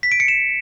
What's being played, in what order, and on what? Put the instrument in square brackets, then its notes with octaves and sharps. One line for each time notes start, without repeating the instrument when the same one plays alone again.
[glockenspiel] B6
D7
C#7
E7